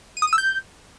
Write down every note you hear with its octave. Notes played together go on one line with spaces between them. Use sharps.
D#7
D#6
D#7
E6
G6